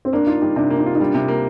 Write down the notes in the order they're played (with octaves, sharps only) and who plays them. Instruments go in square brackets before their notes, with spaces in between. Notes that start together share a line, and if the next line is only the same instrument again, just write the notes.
[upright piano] C4
[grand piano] A#3 [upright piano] D4
[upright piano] D#4 [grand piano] F4
[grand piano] G3 [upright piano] D#4
[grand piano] C3 [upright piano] D4
[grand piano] A#3
[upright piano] D#4
[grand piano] F4
[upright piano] D#4
[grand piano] G3 [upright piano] D4
[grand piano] C3
A#3